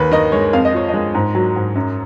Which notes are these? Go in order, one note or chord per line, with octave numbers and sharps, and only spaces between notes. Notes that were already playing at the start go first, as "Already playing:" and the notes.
Already playing: D#2 B4
D#3 D#5
G#3 C#5
F2 F5
D#5
F3 C#5
G#3 D#5
G#2
F#3
G#2
F#2